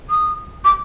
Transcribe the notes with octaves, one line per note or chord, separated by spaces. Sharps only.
D#6
D6